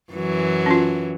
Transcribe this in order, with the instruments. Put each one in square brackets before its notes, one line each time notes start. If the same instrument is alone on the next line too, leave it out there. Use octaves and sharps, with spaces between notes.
[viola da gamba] F#2 E3 F#3
[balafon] C#4 F4